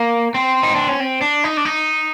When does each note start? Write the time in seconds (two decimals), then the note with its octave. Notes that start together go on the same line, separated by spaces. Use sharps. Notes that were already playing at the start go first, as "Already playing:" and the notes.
Already playing: A#3
0.34 C4
0.63 D#4
0.75 D4
0.88 C#4
1.00 C4
1.21 D4
1.44 D#4
1.57 D4
1.65 D#4